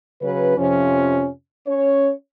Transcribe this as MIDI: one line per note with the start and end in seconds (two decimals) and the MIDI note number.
0.22 0.57 49
0.22 0.57 54
0.22 0.57 61
0.22 0.57 71
0.58 1.29 41
0.58 1.29 48
0.58 1.29 53
0.58 1.29 61
1.67 2.11 61
1.67 2.11 73